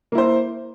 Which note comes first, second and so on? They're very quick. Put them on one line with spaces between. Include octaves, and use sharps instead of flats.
A#3 E4 C5